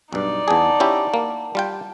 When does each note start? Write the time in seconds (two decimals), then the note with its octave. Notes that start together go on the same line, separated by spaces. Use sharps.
0.13 B1 G2 D#4 D5
0.48 E2 G#4 F#5 A5
0.80 C#4 E4 G4
1.14 A#3
1.55 G3 F4 G5